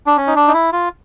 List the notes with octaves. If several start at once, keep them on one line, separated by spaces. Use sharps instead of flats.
D4
C#4
D#4
D4
D#4
E4
F4